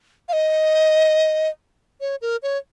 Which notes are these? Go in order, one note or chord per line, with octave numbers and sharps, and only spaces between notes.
F5
D#5
C#5
A#4
C#5